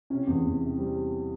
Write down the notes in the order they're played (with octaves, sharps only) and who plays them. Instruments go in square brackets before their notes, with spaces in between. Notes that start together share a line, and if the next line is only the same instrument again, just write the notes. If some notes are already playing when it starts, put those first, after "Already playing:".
[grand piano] C3 C#4
E2
E2
C3
G3 C4